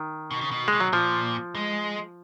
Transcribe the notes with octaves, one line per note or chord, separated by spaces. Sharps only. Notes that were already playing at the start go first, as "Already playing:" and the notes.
Already playing: D#3
B2
C#3
B2
B2 G#3
F#3
A#2 F3
G#3